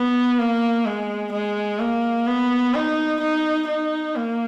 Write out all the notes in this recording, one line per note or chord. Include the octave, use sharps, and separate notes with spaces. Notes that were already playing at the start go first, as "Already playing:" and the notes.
Already playing: B3
A#3
G#3
G#3
A#3
B3
D#4
D#4
D#4
A#3